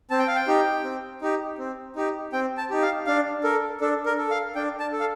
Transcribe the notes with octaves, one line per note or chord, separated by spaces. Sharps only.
C4 A5
G5
F5
G5
D#4 G4
C4
D#4 G4
C4
D#4 G4
C4 G5
A5
D#4 G4
F5
D4 F5
A4 A#4
D4 A4
A#4
A4
F5
D4 G5
A5
A4
F5